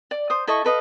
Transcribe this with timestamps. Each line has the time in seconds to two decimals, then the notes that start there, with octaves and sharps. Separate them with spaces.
0.11 D5
0.30 C5 D#6
0.47 E4 A4 D#5 C#6
0.64 A4 B4 D#5 F5